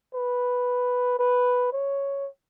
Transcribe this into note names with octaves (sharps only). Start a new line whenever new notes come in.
B4
B4
C#5